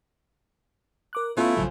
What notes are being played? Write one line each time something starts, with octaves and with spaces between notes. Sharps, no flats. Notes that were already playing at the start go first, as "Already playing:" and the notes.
A#4 D6 F#6
A3 B3 C#4 E4 F4
A#1 F#2 C#3 F3 F#3